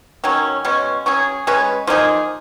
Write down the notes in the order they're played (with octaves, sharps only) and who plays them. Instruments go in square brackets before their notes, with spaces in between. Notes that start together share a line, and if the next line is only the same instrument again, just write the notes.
[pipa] D#3 F#3 C#4
B2 G#3 C#4
F#3 C#4 G#4
G#3 C#4 G#4 B4
F3 A#3 D#4 G#4